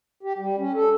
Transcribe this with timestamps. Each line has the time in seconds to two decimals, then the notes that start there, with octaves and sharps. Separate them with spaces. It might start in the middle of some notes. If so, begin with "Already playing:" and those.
0.23 G4
0.38 G3
0.58 C#4
0.74 A4